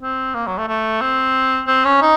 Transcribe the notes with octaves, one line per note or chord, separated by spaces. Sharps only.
C4
A#3
F#3
A3
A3
C4
C4
C#4
D#4